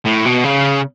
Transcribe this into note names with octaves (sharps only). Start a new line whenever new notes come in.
A2
B2
C#3